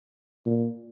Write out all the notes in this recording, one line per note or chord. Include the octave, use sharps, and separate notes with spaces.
A#2